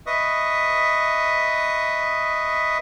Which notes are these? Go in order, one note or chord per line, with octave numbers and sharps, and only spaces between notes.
B4 D#5 E5 C#6 D#6